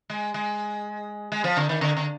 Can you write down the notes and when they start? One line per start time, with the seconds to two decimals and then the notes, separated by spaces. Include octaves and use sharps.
0.10 G#3
0.34 G#3
1.32 G#3
1.44 F3
1.57 D3
1.69 D#3
1.81 D3
1.97 D3